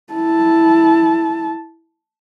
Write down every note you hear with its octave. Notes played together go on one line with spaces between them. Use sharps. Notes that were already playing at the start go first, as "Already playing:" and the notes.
E4 A5